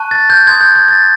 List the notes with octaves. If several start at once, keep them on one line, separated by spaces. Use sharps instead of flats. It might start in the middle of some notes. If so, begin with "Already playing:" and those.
Already playing: A5 C#6 F#6
A6
G6
C6 D#6 G6 G#6
G6
G#6
A6